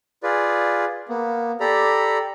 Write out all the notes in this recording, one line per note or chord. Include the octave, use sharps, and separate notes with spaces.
F4 G#4 B4 D5
A#3 B3
G4 A4 D5 A#5 B5